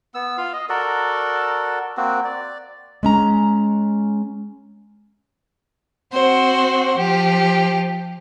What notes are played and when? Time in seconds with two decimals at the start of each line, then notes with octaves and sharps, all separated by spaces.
0.14 B3 E6
0.38 F4 F5
0.53 D#5
0.69 F#4 A4 A#4 D5
1.97 A#3 C4 F#4
2.25 D5
3.03 G#3 C#4 A#5
6.13 C4 F#4 C5
6.98 F3 G4